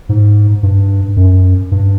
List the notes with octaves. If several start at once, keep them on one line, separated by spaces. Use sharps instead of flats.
G#2
G2
F#2
G2